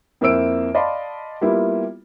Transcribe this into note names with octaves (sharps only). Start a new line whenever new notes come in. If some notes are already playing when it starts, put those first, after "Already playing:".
F2 A#3 E4 C5 E6 D7
D5 D#5 F5 A5 B5 C6
G3 A#3 B3 E4 F4